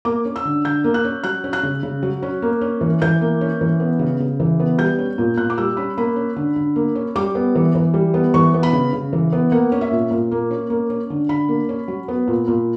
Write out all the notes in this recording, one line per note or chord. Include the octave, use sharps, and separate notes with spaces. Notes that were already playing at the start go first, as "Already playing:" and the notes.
A#3 D6
C#4
E6
D3
D3 G6
A#3
F#6
C#4
F#3 F#6
C#4
F#6
C#3
C#3
F#3
C#4
A#3
C#4
E3
E3 G6
A#3
C#4
E3
B3
C#3
C#3
E3
B3
G3 G6
C#4
A#2
A#2 F#6
D6
G3 E6
C#4 B5
A#3 B5
C#4
D3
D3
A#3
C#4
G3 D6
B3
E3
E3
G3
B3
E3 C#6
B3
B5
C#3
C#3
E3
B3
A#3 F#5
C#4
E5
A#2
A#2
A#3
C#4
A#3
C#4
D3
D3 B5
A#3
C#4
F#3
B3
A#2
A#2